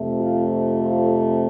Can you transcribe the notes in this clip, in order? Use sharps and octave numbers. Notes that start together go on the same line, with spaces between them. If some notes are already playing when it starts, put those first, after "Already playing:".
Already playing: F2 C3 F3 A3
F4
F4 A4